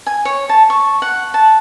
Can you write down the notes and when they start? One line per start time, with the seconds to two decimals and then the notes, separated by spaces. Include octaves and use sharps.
0.07 G#5
0.25 C#5
0.49 A5
0.70 C#6
1.02 F#5
1.34 A5